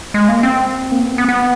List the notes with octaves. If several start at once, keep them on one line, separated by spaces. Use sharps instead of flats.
G#3
A#3
C4
A#3
B3
C4
B3
B3